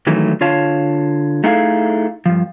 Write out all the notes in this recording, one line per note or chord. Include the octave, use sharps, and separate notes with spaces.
D#3 E3 F#3 G#3 A3 D#4
D3 F4 C#5 F5 A5
A3 D#4 E4 G#4 A4 F5
G2 F3